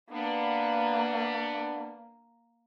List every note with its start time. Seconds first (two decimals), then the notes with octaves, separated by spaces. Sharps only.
0.12 A#3 B3 D4